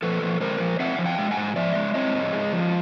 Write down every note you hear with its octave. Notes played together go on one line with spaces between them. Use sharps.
F3 A4 B4
F3
G#3 A#4 C5
F3
C4 E5 F#5
F3
F5 G5
G#3
F#5 G#5
G#2
F3 D5 E5
G#3
C4 C#5 D#5
G#2
G#3
F3